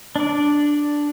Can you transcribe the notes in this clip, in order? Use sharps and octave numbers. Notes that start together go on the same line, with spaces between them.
D4 D5